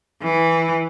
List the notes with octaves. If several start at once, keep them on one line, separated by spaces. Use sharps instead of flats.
E3